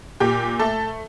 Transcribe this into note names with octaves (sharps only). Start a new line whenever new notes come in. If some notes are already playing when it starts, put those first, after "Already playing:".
A#2 G4
A3 A4